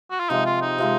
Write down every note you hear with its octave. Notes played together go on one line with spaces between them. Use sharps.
F#4
F4
C3 F3 G#3 D#4
F4
D#4
C3 F3 G#3